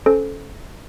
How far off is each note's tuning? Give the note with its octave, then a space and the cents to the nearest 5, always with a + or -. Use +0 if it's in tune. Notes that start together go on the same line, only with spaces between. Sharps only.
C#4 +0 A4 -15 C5 +0